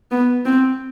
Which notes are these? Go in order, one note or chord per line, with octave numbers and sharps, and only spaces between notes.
B3
C4